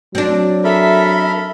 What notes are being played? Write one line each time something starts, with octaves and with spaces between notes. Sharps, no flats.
F#3 C4 D4
A4 A#4 E5 B5